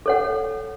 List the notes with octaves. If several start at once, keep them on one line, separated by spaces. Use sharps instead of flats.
A4 C#5 F#5